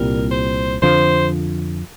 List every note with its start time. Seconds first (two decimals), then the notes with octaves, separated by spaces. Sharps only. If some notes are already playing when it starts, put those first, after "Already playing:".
Already playing: C2 A#2 G3 A#4
0.31 C5
0.82 F2 D3 F3 C5